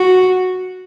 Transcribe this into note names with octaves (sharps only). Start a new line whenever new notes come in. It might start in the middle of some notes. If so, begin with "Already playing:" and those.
Already playing: F#4